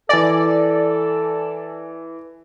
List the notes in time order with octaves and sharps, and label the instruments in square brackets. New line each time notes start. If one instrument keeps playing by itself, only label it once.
[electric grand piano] E3 G#5 A#6 [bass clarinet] A4 [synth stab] D5